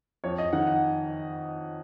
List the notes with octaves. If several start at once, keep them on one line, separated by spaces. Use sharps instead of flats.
F2 C#5
D#5
D#3 F#5
F#5